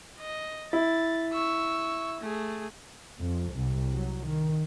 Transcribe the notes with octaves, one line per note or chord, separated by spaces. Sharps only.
D#5
E4 A6
C#6 E6
A3 G#4
F2
C2
F#3
D#3